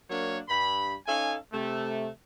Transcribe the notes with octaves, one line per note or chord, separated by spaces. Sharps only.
F#3 A#3 D4 A#4 C#5
G2 B5
C#4 D#4 A4 F5 G#5
C3 A3